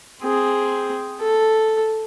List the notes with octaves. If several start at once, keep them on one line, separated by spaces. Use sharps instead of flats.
C4 G#4
A4